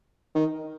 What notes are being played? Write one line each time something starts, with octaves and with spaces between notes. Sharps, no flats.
D#3